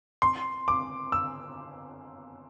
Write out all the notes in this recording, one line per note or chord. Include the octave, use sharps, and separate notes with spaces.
C6
D6
E6